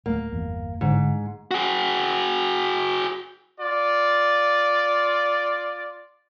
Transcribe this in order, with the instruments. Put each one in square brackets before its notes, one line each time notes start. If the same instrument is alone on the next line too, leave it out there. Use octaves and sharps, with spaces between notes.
[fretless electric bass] D1 A3 [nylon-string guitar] A#3
[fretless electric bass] G1 E2
[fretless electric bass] G1 D3 [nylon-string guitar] G#2
[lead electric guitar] F#4 G#4
[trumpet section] F4 D5